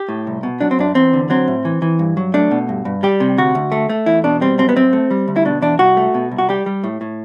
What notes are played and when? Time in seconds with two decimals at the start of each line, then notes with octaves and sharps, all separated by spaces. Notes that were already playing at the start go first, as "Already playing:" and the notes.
Already playing: G4
0.08 A2
0.27 C2
0.43 B2
0.61 F#3 D4
0.71 C4
0.79 F#2 D4
0.95 E2 C4
1.13 D3
1.30 F#3 C4
1.48 A2
1.65 E3
1.82 E3
1.99 G2
2.17 F#3
2.34 A3 D4
2.51 B2
2.69 G2
2.85 G2
3.03 G3 G4
3.20 C3
3.37 D2 F#4
3.55 D2
3.72 A3
3.90 A3
4.06 E2 E4
4.24 B2 D4
4.41 G3 C4
4.58 F#2 C4
4.69 B3
4.76 F#2 C4
4.93 A3
5.11 G3
5.28 D2
5.36 E4
5.45 B2 D4
5.62 E2 D4
5.79 C2 F#4
5.97 A3
6.14 B2
6.31 C2
6.38 F#4
6.49 G3 G4
6.66 G3
6.84 A2
7.01 A2